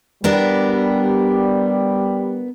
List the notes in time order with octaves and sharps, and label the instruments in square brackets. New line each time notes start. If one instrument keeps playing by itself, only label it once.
[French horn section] G3 [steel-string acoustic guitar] B3 D4 A#4